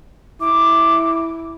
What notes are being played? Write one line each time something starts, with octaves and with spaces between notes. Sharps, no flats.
E4 D6